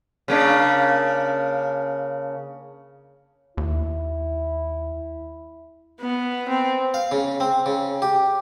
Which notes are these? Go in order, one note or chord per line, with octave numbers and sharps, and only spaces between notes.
C#3 A#3 D4
D#2 E4
B3
C4
F5
C#3
C4
C#3
G4